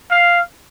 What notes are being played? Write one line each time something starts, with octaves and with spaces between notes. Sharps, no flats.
F5